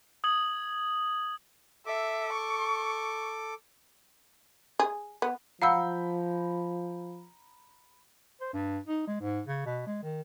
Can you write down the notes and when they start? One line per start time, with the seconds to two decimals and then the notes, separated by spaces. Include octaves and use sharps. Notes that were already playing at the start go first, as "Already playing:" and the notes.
0.24 D#6 G#6 F#7
1.86 A4 E5 D6
2.33 C#6
4.80 G#4
5.22 B3
5.62 F3 F5 F#5 A#5 B5 E6 G6
8.41 C5
8.53 G2
8.87 D#4
9.07 G#3
9.21 G#2
9.47 C#3
9.66 B2
9.87 G#3
10.03 D#3